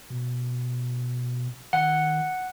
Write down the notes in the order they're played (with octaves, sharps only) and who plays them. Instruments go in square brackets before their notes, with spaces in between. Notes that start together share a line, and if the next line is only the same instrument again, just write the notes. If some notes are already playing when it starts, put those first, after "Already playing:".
[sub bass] B2
[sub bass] D#3 [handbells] F#5